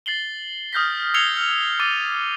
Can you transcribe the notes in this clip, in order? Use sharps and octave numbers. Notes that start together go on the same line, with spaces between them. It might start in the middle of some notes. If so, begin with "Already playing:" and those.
A6 C7 F#7 G7
D#6 F6 G6 A#6 B6
E6 G#6 C7 C#7 F7 G7
F6
D6 E6 A6 D#7 G7